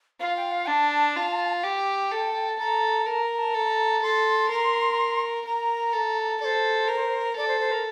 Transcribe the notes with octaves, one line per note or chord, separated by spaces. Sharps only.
F4 F5
G5
F5
D4 A5
F4
G4 G5
A4
A4 A#5
A#4 A5
A#5
A5
A4 A#5
A4 C6
A#4
A#4 A#5
A4
A4 C5 D5
A#4
A4 D5
C5
C5
A#4